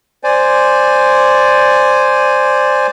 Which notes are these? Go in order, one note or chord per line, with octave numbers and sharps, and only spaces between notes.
C5 D5 G#5